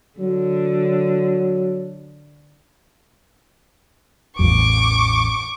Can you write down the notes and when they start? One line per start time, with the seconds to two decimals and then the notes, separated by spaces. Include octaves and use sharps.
0.19 D3 F#3
4.39 A1 E2 C#6 D6